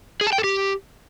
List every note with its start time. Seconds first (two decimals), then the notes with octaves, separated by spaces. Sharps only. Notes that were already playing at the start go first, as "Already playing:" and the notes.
0.21 G#4
0.27 A5
0.33 G5
0.38 A4
0.44 G4